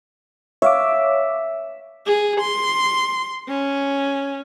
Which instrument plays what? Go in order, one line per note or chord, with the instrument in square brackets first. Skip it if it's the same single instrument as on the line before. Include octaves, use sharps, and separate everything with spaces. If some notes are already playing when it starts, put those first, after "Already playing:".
[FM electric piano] C#5 F5 D6 [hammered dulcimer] E5
[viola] G#4
C6
C#4